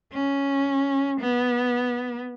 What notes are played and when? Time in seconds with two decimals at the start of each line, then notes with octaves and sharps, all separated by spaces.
0.13 C#4
1.21 B3